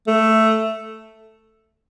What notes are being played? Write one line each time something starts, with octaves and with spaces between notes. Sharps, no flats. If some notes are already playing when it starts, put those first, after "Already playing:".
A3